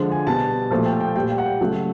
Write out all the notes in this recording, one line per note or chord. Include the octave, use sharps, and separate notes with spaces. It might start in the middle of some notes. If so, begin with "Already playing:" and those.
Already playing: D3 F3 G#3
G#5
B2 G3 A5
A#2 F3 A3
G5
G5
A#2 G3 G5
G5
F#5
G5
C#3 F#3 A3